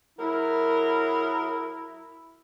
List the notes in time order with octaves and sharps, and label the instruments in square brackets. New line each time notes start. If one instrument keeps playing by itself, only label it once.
[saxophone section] F#3 G#4 A#4 [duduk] E4